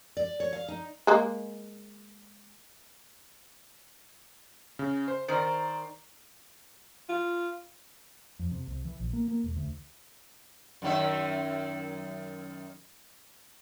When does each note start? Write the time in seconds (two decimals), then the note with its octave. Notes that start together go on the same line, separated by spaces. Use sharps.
0.17 D5
0.40 C#5
0.53 F5
0.68 D#4
1.07 G#3 A#3
4.79 C#3
5.08 C5
5.28 D#3 A#4 C5 D5
7.09 F4
8.39 F2
8.52 C3
8.68 C2
8.85 E3
9.00 A#1
9.13 A#3
9.28 A#3
9.44 E1
9.56 D2
10.82 F#2 D#3 E5